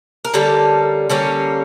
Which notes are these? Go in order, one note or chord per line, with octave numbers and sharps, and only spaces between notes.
A#4
D3 G3 A#3 C#4 A4
D3 G3 A#3 C#4